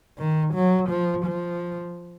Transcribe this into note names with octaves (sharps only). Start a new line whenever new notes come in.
D#3
F#3
F3
F3